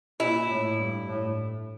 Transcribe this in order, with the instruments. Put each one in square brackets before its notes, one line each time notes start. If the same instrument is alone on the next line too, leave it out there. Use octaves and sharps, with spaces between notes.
[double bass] A#2 [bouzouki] E4
[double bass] A2
G2
A2